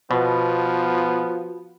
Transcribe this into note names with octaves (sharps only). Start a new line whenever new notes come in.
B2 F3 B3 F#4 B4